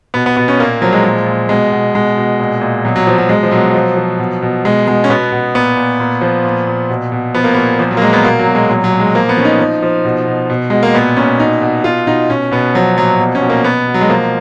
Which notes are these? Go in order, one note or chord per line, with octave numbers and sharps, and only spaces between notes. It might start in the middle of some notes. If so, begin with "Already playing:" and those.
B2 B3
B3
B2 B3
C#4
A#2 A#3
F3 F#3
G#3
A#2 G#3
A#2
B2 G#3
B2
B2 G#3
B2
A#2
A#2
B2 F#3
F#3
B2 F3
F#3
B2 G#3
F3
B2 F#3
F3
F3
B2
B2
B2 G#3
B2 G#3
C#4
B2 B3
B2
A#2 B3
A#2
A#2
F3
A#2
A#2
B2
B2
F3 B3
A#3
A#2 B3
A#2 F3
F#3
A#3
A#2 G#3
B3
B2 A#3
F#3
B2
G#3
A#2 F#3
F#3
A#2
G#3
F3 A#3
B3
F3 C#4
D#4
F3
F3
B2
B2
B2
B2 G#3
A#3
A#2 B3
A#2 C#4
B2 D#4
B2
B2 F4
B2 D#4
B2 C#4
B2 B3
F3 F#3
A#2 F#3
B2
C#4
B2
A#3
B2 B3
B2
F#3
G#3
F3 A#3